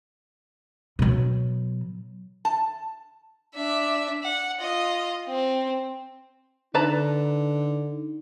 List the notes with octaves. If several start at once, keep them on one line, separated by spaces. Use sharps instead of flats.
B2 F#3
A5
D4 E5
F#5
F4 D#5
C4
D3 D#4 B4 A5 A#5